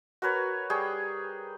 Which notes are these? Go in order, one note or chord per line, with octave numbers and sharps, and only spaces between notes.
F#4 A#4 B4 C#5
G3 G#4 G5 C#6